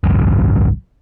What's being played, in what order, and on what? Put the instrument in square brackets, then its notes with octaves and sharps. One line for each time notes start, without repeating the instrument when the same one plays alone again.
[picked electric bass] G#1 C#2 F#2